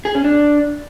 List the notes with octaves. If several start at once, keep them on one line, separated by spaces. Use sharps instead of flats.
G#4
C#4
D4